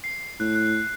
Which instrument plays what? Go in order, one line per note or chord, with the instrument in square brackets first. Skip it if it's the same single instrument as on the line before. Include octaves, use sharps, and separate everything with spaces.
[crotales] C7
[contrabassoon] A2 [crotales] F#6
[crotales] F#6